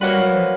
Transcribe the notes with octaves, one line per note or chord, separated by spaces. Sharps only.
G3 A#3 C#4 F#4 B4
F#3
F3